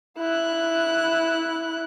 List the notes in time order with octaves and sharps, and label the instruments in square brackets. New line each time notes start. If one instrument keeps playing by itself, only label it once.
[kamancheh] E4 F#6